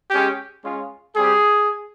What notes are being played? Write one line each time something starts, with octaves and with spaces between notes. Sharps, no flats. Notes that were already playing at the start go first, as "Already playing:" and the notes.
G#3 C#4 G4
G#3 C#4 F4
G3 C4 G4 G#4